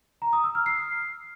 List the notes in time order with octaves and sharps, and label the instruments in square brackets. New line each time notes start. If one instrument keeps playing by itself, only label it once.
[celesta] A#5
D#6
E6
F6
C7